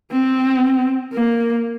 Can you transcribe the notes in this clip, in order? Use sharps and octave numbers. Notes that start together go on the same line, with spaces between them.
C4
A#3